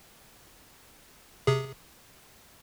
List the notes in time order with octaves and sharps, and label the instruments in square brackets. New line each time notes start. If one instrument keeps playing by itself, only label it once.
[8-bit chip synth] C3 G#4